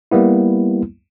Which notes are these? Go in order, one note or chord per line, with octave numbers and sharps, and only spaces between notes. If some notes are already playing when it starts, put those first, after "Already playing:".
G3 A#3 B3 E4